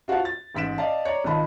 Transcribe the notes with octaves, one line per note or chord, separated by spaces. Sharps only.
F4 F#4 C5 F5 A5
A6
A1 G#2 B6 D7 E7
D5 D#5 F5 A5
C#5 D5 A#5
G#1 D#3 F3 D#5 A5 B5